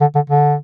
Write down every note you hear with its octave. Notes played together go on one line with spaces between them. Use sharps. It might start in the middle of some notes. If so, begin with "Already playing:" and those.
D3
D3
D3